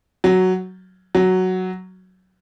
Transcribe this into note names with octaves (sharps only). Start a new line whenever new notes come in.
F#3
F#3